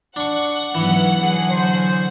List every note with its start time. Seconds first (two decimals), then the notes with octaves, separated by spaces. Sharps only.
0.16 D4 F#5 C#6
0.75 G#2 E3 F#3 B3
1.20 D3 F#3 G#4
1.50 C5